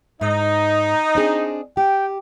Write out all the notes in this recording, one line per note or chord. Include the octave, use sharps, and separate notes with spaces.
G#2 D#4 D#5
C4 D4 G#4
G4 G5